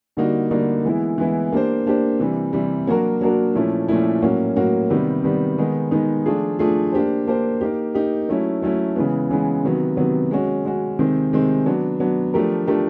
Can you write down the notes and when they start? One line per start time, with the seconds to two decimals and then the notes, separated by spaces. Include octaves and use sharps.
0.17 D3 G3 A#3 D#4 F#4
0.50 D3 G3 A#3 D#4 F#4
0.85 E3 G#3 B3 E4
1.18 E3 G#3 B3 E4
1.52 A#3 D4 G4 C5
1.86 A#3 D4 G4 C5
2.19 C3 E3 G3
2.53 C3 E3 G3
2.87 F#3 A#3 D4 F#4 A#4
3.21 F#3 A#3 D4 F#4 A#4
3.55 A#2 F3 A3 C#4 E4
3.88 A#2 F3 A3 C#4 E4
4.22 A2 F#3 A#3 C#4 F#4
4.56 A2 F#3 A#3 C#4 F#4
4.90 C3 D#3 G3 B3
5.23 C3 D#3 G3 B3
5.58 D#3 G#3 B3 D#4
5.91 D#3 G#3 B3 D#4
6.26 F3 A3 D4 F4 G#4
6.59 F3 A3 D4 F4 G#4
6.92 A#3 D4 G4 C5
7.27 A#3 D4 G4 C5
7.61 A#3 D#4 G4
7.94 A#3 D#4 G4
8.29 F#3 A3 C#4 E4
8.62 F#3 A3 C#4 E4
8.96 C#3 E3 G#3 B3
9.30 C#3 E3 G#3 B3
9.64 C3 D#3 F#3 B3
9.97 C3 D#3 F#3 B3
10.31 G#3 C#4 F#4
10.65 G#3 C#4 F#4
10.99 C3 D#3 G#3 C4
11.33 C3 D#3 G#3 C4
11.66 F#3 B3 D4
12.00 F#3 B3 D4
12.34 F3 A3 D4 G4 A#4
12.67 F3 A3 D4 G4 A#4